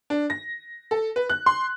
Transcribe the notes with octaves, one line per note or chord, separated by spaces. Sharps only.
D4
A#6
A4
B4
F#6
C6